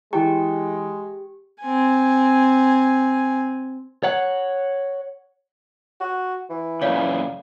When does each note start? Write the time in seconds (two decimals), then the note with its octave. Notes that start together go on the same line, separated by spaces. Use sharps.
0.13 E3 G#3 G4 G5
1.60 C4 G#5
4.03 C#5 F#5
6.01 F#4
6.50 E3
6.82 F#2 A#2 C#3 C#5 D5 F5